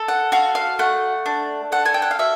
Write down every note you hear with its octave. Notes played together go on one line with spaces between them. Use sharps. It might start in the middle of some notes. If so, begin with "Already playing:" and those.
Already playing: A4
F#5
F#4 F5
F5
A3 F#5
D4
A4 F#5
G#5
G5
F#5
F5
F#4 E5